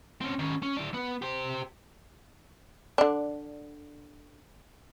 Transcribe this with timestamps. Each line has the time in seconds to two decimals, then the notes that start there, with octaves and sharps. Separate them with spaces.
0.21 C4 C#4
0.39 D#3 C#4
0.63 C#4
0.77 E4 D5
0.94 B3
1.22 G4 C5
2.98 D3 D4